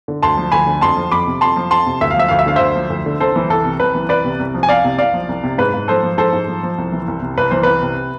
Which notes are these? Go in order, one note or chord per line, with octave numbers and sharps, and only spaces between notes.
D3
D2 A5 C6
F3
D2 G#5 B5
D3
F2 A5 C6
F3
F2 B5 D6
C3
F2 A5 C6
F3
F2 A5 C6
C3
D2 E5
F5
F3 E5
D2 F5
E5
D3 F5
D2 C5 E5
F3
D2
D3
C2 A4 C5
E3
C2 A4
C3
C2 B4
E3
C2 B4 D5
C3
C2
F3
G#5
C2 D5 F5
C3
C2 D5 F5
F3
C2
C3
G#2 B4
G#2
F3 A4 C5
F3
G#2 A4 C5
G#2
F3
F3
C2
E3
C2
C3
C2 B4
E3 C5
C2 B4
C3